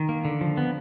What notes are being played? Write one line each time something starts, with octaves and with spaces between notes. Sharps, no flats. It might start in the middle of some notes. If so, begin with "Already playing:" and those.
Already playing: D#3
A#3
D3
F3
B3